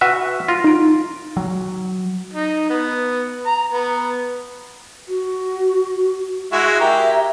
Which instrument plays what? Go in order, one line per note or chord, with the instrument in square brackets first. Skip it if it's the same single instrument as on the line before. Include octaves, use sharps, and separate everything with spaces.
[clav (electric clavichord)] F#4 B4 E5 [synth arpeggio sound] F#5 F6
[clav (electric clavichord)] F4 [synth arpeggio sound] A#6
[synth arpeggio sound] D#4 D7
[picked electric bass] F#3
[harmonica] D#4
B3
A#5
B3
[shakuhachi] F#4
[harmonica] G#3 E4 F#4
[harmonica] G4 A#4 [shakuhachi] E5